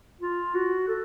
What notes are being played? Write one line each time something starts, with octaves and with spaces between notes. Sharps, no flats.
F4
F#4
A4